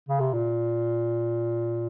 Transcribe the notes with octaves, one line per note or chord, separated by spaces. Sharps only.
C#3
C3
A#2